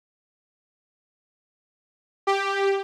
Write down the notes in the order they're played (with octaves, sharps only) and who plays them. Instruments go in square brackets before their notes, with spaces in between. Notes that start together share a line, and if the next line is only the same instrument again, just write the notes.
[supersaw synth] G4